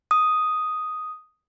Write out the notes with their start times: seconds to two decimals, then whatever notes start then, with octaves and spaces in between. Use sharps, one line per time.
0.11 D#6